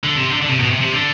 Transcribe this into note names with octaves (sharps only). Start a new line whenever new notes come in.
D3
C3
D3
D3
C3
B2
C3
C3
D3